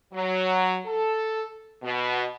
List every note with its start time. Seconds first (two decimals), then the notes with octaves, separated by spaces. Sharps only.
0.13 F#3
0.86 A4
1.83 B2